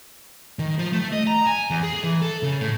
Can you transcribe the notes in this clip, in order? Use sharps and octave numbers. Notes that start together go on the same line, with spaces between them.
D#3
F3
A3
D#5
A#5
G#5
E2
G#4
E3
A4
C#3
A2